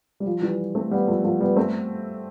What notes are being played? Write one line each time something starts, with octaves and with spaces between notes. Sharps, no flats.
G3
F3
E3 G3
A3 C4
G3 B3
F3 A3
F3 A3
G3 B3
A3 C4